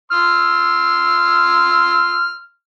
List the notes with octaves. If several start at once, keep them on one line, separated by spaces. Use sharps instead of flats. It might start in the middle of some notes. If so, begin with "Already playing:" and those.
C6 E6 F6